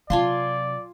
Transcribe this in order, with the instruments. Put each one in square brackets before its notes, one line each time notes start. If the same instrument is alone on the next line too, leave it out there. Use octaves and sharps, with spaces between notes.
[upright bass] C3 F#3 [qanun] F4 G#5 C6 [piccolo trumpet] D5 [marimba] F5 A5